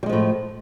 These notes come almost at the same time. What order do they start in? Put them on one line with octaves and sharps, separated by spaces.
G3 G#3 F3 A2